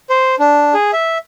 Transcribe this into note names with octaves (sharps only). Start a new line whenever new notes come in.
C5
D4
G#4
E5